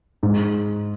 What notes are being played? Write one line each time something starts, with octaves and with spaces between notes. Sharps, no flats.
G#2